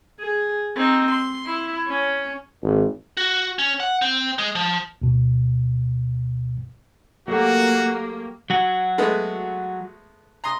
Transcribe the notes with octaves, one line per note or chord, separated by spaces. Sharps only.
G#4
C4 D#4
C6
E4
C#4
G#1
F#4
C#4
F#5
C4
G#3
F3
D2 B2
F#3 A3 A#3 F#4 G4
F#3 F#4
G#3 A3 B3
A#5 C6 D#6